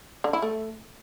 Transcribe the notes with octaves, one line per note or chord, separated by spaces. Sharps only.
D3
E4
A3